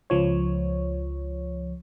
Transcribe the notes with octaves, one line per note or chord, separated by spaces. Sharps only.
C#2 F3 C#5